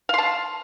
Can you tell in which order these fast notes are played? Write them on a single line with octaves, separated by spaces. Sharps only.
F5 C6 A5